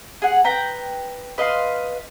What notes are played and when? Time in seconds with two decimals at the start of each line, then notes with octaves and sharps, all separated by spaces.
0.22 G#4 F#5
0.45 B4 G5 A#5
1.38 B4 D#5 F5 C6